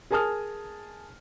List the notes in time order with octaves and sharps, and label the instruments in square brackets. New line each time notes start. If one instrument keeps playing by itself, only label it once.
[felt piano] G#4 A#4 G#5 A5 D#6 F6